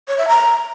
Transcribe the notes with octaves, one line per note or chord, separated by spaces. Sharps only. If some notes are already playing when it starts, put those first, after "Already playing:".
C#5
E5
A#5